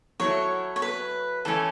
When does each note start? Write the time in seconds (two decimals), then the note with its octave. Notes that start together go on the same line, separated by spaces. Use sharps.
0.20 F#3 A3 E4 C#5
0.76 C#5
0.82 B4
1.45 E3 A3 C#4 A4